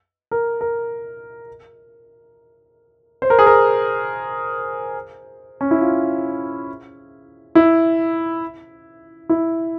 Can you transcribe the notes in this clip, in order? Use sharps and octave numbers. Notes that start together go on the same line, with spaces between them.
A#4
A#4
C5
A#4
G#4
A#4
C#4
E4
F4
E4
E4